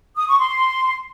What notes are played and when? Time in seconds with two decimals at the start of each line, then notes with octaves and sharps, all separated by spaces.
0.17 D#6
0.28 C#6
0.39 C6